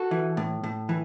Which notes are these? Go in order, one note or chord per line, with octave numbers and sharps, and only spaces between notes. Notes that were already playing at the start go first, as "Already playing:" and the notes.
Already playing: F#4 A4
E3
A2
A2
E3